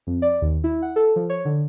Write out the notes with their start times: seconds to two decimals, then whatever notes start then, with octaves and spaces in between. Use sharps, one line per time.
0.07 F2
0.22 D5
0.42 D#2
0.64 E4
0.82 F#5
0.96 A4
1.16 F3
1.30 C#5
1.45 D3